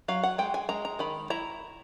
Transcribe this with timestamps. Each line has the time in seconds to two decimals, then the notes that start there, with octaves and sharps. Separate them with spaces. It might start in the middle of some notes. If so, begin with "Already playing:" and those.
0.08 F#3 F5
0.24 F#5
0.38 G#3 G5
0.54 G#5
0.69 G#3 A#5
0.85 A#5
0.99 D#3 B5
1.30 E4 A#5